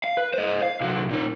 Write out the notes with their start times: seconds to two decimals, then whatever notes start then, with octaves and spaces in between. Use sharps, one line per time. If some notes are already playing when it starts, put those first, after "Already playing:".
0.04 F5
0.17 B4
0.34 C5 D#5
0.63 F5
0.81 C2 F#3
1.11 A#2 D#4